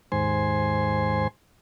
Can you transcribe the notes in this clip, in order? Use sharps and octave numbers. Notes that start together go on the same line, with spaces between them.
D#2 G#2 C5 G#5 C6